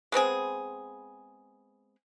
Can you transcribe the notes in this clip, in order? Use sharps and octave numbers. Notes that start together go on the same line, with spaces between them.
G#3 B3 C4 G#4